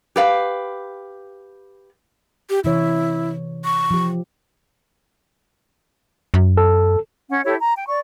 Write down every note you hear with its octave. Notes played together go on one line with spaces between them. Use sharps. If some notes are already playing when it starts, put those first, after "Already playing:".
G4 B4 F5
G4
C3 E3 E4 C#5
C#6
F3 G4
F#2
A4
C#4 F#5
E4 G4 A4 C#5
A#5
G5
D5 C#6